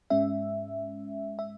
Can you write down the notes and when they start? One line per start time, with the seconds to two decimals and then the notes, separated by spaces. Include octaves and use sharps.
0.10 G#2 G#3 C#4 E5
1.39 E5